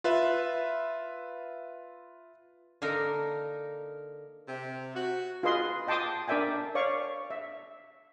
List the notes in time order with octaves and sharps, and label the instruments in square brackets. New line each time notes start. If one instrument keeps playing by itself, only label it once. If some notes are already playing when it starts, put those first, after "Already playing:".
[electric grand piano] F4 B4 E5
[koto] D3 A#3 D#4 A#4
[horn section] C3
F#4
[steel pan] F4 G#4 B4 D#5 C6
D#5 G5 A5 C6 D6 D#6
D4 A#4 D5 E5 G5 G#5
C#5 D5 F5 C#6
E5